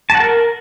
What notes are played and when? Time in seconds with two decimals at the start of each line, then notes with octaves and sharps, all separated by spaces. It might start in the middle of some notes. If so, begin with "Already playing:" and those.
0.10 A5
0.15 F#5
0.20 A#4